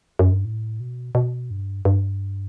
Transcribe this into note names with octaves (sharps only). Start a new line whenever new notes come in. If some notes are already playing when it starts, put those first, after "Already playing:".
F#2
G2
A2
B2
B2
G2
G2